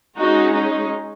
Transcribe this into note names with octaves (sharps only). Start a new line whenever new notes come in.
G#3 C#4 D#4 F#4
D#4